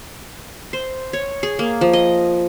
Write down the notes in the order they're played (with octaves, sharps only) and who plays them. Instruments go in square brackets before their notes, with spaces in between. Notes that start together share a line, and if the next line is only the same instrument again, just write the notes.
[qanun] C5
C#5
G#4
A#3
F3
D#5